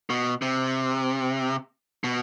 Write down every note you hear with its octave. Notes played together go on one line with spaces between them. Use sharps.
B2
C3
B2